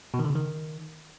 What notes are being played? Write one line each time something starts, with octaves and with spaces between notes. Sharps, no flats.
B2
D#3
D3
C#3
D#3